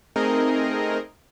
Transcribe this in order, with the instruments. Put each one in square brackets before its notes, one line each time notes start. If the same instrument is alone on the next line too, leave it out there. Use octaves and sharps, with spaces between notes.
[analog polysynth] A3 C4 D#4 G#4 A#4 D#5